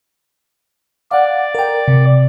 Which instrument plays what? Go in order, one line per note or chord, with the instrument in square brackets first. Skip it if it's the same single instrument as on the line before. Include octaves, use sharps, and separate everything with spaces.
[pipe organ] D5 [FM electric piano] F5 F#5
[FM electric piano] A#4 G5
C3